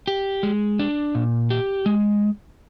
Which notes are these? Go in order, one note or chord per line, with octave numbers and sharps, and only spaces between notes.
G4
G#3
D4
A#2
G4
G#3